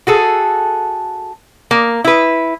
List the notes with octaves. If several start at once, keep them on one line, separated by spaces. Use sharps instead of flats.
F#4 G#4 A4
A#3
E4 B4